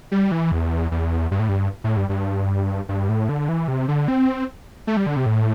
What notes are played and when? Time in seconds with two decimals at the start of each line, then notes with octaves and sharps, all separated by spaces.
0.12 G3
0.32 E3
0.52 E2
0.91 E2
1.31 G2
1.39 A2
1.49 G2
1.84 A2
1.97 G2
2.09 G2
2.89 G2
3.09 A2
3.29 D3
3.49 E3
3.68 C3
3.88 D3
4.08 C4
4.87 A3
4.97 G3
5.06 D3
5.16 C3
5.26 A2